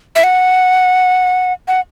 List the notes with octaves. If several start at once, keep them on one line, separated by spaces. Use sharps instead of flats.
E5
F#5
F#5